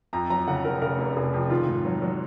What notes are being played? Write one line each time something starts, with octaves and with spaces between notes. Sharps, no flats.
F2 A#5
F#3 A#5
C#3 F#5
F1 A#4
C#3 A#4
F1
F1 G#4
F2
D#3 F4
G#2
F#3
F#3